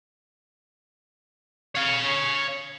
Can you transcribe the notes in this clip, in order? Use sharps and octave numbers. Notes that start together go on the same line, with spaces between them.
C#5 F5